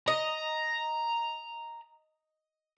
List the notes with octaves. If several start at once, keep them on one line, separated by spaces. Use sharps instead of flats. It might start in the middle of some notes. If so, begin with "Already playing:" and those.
D#5 A#5